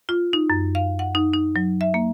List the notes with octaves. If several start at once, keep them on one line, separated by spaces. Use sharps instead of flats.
F4
D#4
F#2
F5
F#5
D#4
D#4
F#3
E5
A#3